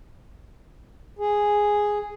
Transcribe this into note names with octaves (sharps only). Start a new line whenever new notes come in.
G#4